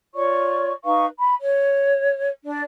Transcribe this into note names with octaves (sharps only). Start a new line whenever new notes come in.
F4 C#5 D5 C#6
D#4 B4 F5 C#6
B5
C#5
D4 D5